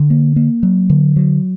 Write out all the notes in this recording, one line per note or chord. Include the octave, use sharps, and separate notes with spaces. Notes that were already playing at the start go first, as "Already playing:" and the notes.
Already playing: D3
A#3
A#3
F#3
D3
F#3